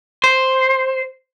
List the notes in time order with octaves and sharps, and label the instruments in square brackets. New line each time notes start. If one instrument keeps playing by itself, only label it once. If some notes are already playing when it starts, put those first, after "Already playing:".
[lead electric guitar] C5